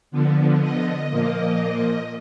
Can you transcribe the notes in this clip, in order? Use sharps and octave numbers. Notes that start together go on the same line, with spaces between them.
D3 F3 B3
D#5
A#2 F3 A#3